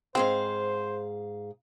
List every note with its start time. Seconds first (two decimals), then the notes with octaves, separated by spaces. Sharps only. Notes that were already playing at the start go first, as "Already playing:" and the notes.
0.15 G#2 C4 G#4 C5 F5